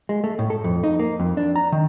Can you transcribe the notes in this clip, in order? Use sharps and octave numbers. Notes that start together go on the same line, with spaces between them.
G#3
A3
A2
A4
F2
D#4
A#3
F2
D4
A#5
D#3